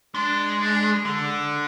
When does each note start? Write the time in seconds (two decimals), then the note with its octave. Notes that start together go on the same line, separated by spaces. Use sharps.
0.15 G#3 D4
0.60 D4
1.06 D3